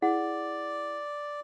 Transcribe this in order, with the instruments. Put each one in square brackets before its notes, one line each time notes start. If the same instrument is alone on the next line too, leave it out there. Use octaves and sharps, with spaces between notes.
[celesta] E4 G#4 F#5 [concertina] D5